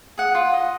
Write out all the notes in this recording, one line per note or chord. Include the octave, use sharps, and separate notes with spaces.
G#4 F#5
F4
D#5